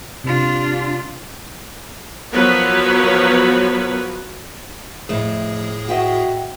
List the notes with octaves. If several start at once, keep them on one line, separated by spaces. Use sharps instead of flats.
C3 D4 F4
F3 F#3 B3 A#4 B4 C#5
F2 A2 A3 G#4
F#4 D#5 E5 G5